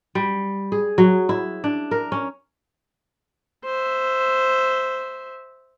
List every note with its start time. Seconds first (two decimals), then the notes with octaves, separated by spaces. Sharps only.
0.15 G3
0.72 G#4
0.98 F#3
1.29 E4
1.64 D4
1.91 A#4
2.12 C#4
3.65 C5 E5